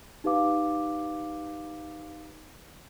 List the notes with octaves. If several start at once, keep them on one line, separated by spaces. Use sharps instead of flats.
D#4 G4 B4 F5 D6